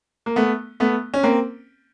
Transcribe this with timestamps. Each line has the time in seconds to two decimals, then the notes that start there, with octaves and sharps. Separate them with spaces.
0.26 A#3
0.36 A3 B3
0.80 A3 B3
1.14 C#4
1.23 A#3 C4